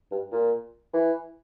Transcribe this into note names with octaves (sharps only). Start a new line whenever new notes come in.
G2
A#2
E3